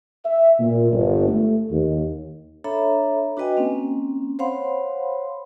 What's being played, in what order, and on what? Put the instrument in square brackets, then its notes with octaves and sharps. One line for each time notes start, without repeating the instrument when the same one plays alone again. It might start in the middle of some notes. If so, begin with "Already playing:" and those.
[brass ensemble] E5
A#2
G1
A3
D#2
[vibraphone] D4 A4 C#5 E5 A#5 B5
D4 F#4 B4 D#5 G5 G#5
A#3 C4 C#4
C5 C#5 F5 F#5 B5 C6